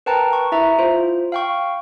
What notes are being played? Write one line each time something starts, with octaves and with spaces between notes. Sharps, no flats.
A#4 B4 G5 A5 A#5
C#6
E4 E5 A#5
F4 C5
F5 G5 C#6